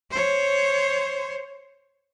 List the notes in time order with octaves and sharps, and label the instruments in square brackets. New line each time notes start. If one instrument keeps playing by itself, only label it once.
[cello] C5 C#5